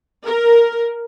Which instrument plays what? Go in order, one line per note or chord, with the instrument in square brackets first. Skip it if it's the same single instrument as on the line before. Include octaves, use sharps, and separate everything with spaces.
[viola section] A#4